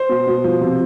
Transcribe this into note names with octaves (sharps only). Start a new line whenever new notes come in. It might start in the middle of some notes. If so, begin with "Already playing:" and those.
Already playing: C5 C6
B2
B2
F3
C3